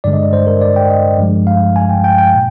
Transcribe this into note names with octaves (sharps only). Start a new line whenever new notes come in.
G2 D3 G#3 D5
D#5
D5
C5
A#4
D5
G5
D#5
G2 F3 G#3
F5
G#5
G5
G5
G5
A#2